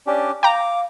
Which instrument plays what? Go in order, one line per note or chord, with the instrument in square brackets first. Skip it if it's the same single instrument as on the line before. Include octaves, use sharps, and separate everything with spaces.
[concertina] C#4 D4 G4 [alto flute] D5
[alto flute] F5 [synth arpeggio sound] G5 A#5 [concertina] D6